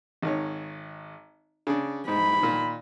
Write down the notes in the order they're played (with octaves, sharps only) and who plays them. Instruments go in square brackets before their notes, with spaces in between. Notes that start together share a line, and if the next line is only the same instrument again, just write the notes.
[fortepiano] G#1 D#3 C#5
C#3 D4
[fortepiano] G#2 [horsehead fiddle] B5
[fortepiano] A#2 D#3